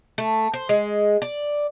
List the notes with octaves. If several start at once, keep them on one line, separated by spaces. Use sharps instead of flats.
A3
C5
G#3
D5